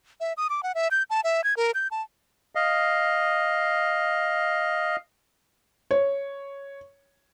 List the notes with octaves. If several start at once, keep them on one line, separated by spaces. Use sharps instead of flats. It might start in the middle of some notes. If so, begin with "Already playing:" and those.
E5
D#6
D6
F#5
E5
G6
A5
E5
G#6
A#4
G6
A5
D#5 F5
C#5